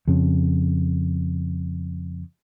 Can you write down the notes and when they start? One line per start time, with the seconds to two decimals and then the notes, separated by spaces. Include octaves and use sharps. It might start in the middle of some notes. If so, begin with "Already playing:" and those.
0.08 F2 C#3